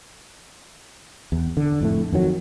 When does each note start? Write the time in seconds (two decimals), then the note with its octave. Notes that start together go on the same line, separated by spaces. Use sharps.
1.32 E2
1.57 D3
1.81 F2 A2 A3
2.12 F2 D#3 F#3